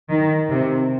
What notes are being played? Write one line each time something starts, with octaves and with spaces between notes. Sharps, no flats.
D#3
C3